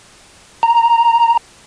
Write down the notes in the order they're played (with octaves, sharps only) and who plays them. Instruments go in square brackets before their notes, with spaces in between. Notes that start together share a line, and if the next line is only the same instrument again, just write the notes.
[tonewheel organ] A#5